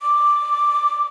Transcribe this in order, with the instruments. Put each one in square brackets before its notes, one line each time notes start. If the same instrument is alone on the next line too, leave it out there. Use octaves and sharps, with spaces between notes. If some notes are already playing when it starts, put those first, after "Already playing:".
[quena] D6